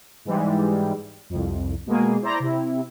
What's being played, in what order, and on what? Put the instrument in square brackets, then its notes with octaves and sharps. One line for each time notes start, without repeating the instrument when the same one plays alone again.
[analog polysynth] G#2 E3 G3 G#3
C2 F2
B2 G#3 A#3 G#4
E4 C5 D5 A#5
C3 E4